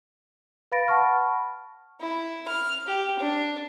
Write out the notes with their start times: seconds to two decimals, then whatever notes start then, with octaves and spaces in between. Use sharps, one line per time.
0.72 B4 F5 B5 A6 A#6 D7
0.88 F#5 A5 B5 C#6 F6
2.01 E4
2.47 F6
2.87 G4
3.19 D4